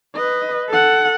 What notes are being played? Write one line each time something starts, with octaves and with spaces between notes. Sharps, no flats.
B4 D#5
A4 F#5